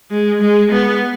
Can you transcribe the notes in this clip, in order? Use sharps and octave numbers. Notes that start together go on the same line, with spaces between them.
G#3
G#3
B3